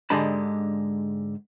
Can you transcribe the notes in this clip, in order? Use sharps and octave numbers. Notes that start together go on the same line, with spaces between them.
G#2 D3 G#3 D4 G4 B5